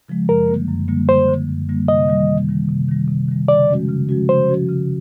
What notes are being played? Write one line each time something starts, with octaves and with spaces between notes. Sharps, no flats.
C#3 F3 G#3
F#2 A#4
D3 G3 A#3
F#2
D3 G3 A#3
F#2 C5
D3 G3 A#3
F#2
D3 G3 A#3
C3 D#5
D#3 G3
C3
D#3 G3
C3
D#3 G3
C3
D#3 G3
C#3 D5
F3 G#3 C#4 F#4
C#3
F3 G#3 C#4 F#4
C#3 C5
F3 G#3 C#4 F#4
C#3